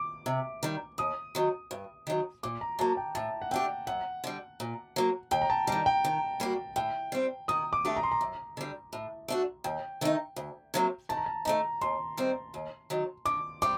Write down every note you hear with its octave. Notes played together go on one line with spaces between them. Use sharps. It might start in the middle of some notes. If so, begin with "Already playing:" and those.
Already playing: D6
C3
D#3 G3
D#2 D#6
D#3 F#3
G2
D#3 F#3
A#2 D6
A#5
F#3 A#3 A5
G5
A2 A5
F#5
A3 D4 G4 G5
F#2 F#5
D3 G3
A#2
F#3 A#3
D#2 G5
A#5
A5
D#3 G3 A#5
G5
D#3
G3 A#3 F#4
A2 G5
G3 C4
D#3 D#6
D6
A3 D4 G4
A#5
C6
A#5
F#2
D3 G3
A2
A3 D4 F#4
D#2 G5
D#3 A3 D#4
D2
C3 F#3 A#3
D#3 A5
A#5
A5
A3 C4 D#4 A#5
D#2 C6
D#3 G3 C4
D#2
D#3 F#3
D3 D6
G3 C4 D6